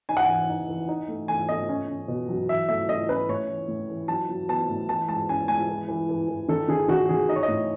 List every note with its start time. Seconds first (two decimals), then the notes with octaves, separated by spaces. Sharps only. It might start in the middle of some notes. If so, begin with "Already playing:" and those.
0.09 D#4 G#5
0.17 F#5
0.25 E3 G#5
0.49 D#4
0.68 E3
0.89 D#4
1.08 A3
1.28 A3 G#5
1.49 A3 D#5
1.69 C#4
1.88 C#4
2.08 B2
2.29 F#3
2.48 E3 E5
2.69 A3 E5
2.89 A3 D#5
3.08 C#4 B4
3.29 A2 C#5
3.49 E3
3.68 A2
3.89 E3
4.08 F#3 A5
4.29 F#3
4.49 B3 A5
4.69 A2
4.89 E3 A5
5.08 G#3 A5
5.29 C#4 G#5
5.48 G#3 G#5
5.69 E3
5.88 E3
6.09 E3
6.29 E3
6.48 D#3 A4
6.68 D#3 G#4
6.88 D#3 F#4
7.09 D#3 G#4
7.29 D#4 D#5
7.36 C#5
7.43 D#5
7.48 A2